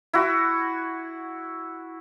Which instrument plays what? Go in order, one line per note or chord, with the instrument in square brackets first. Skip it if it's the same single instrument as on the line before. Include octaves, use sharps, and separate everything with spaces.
[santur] E4 F#4